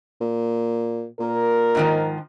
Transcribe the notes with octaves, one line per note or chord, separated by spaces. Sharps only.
A#2
A#2 A#4
G#2 D#3 F3